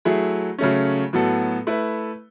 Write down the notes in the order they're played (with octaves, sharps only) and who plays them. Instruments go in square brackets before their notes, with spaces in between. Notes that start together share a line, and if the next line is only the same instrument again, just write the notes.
[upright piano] F#3 A3 E4 G#4
C#3 F#3 A3 C#4
A2 F#3 B3 F#4 A4
A3 E4 B4